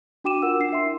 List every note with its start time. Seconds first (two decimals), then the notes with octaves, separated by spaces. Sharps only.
0.24 D4 F#4 G5 D6 D#7 E7
0.42 F4 A#4 F#5 E6
0.60 D4 C7
0.73 E5 C6
0.84 E4